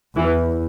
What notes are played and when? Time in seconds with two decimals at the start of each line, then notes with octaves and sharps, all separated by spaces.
0.16 E2 E3